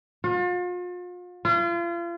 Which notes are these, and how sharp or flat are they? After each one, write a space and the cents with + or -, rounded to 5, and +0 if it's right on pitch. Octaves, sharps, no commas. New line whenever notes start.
F4 +40
F4 -35